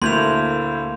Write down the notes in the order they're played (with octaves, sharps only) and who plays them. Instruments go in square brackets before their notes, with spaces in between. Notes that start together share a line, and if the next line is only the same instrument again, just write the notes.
[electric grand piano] D2 A3 E4 [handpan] A#3 [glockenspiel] C6 G6 F7